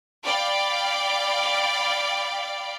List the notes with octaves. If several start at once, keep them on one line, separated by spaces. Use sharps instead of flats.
D5 F5 G5 B5